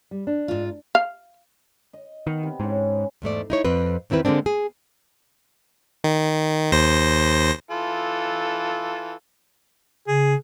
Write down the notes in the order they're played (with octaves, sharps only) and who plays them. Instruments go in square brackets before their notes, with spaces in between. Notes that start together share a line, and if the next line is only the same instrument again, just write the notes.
[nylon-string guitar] G3
D4
[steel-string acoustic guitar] G#2 F4
[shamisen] F5
[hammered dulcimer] D#5
[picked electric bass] D#3 [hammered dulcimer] B3
[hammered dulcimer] C3
[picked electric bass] G#2 [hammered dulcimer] C#4 E4
[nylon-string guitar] E2 G#2 A3 D5
D#4 E4 C#5
F2 C4 B4
E2 D#3 C4 E4 B4
D3 G#3 A#3 C4 D4
G#4
[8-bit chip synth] D#3
D#2 C5 A#6
[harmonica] E3 F4 A4
[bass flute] C#3 [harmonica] G#4